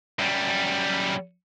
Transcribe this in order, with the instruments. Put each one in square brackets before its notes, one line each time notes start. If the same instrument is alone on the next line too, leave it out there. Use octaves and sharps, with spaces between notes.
[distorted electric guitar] F#2 G3